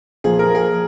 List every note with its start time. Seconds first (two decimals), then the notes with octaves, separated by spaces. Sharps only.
0.24 A#2 F3 A#3 G#4
0.39 A#4
0.55 G#4